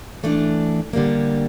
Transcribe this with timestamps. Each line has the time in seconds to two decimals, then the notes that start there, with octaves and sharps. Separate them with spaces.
0.23 E3 A3 D4
0.93 D3 G3 A#3